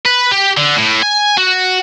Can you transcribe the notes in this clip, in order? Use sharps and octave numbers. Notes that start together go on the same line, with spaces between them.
B4
G4
D3
A2
G#5
F#4